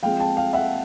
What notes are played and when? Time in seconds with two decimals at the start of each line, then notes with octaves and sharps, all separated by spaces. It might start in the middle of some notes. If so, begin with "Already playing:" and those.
0.03 F3 G#3 C4 F5 G5
0.20 G5 A5
0.37 F5 G5
0.53 E5 F#5